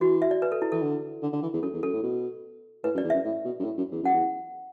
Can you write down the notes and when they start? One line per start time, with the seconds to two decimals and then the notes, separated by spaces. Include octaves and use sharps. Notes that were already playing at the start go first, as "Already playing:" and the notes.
0.01 E3 F#4
0.22 E5
0.31 D5
0.42 B4
0.52 A4
0.62 E4
0.72 E3 A4
0.82 D3
1.22 D3
1.33 D3
1.42 E3
1.53 E2
1.62 F#2 A4
1.73 E2
1.83 F#2 A4
1.93 A2
2.03 B2
2.84 A2 B4
2.94 F#2
2.98 D5
3.04 E2
3.10 F#2 E5
3.24 A2
3.45 B2
3.60 F#2
3.64 A2
3.77 F#2
3.92 E2
4.03 F#2 F#5
4.13 E2